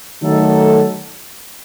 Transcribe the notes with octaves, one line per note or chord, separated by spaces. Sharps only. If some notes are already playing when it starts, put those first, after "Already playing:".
D#3 F#3 A3 D#4 A4